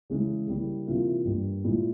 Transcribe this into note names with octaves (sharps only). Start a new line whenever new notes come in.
C#3 E3 G#3 E4
C#3 G3 A#3 E4
C3 E3 A#3 F4
G2 G3 A#3
A#2 G#3 E4